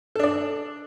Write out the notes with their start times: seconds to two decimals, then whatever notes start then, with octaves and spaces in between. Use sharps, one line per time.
0.15 A4
0.19 D4
0.23 D5